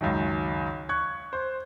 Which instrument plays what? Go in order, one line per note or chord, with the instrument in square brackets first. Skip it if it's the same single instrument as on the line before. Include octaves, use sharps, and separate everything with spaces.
[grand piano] C#2 F#2 D#3
C#6 F#6 G#6
C5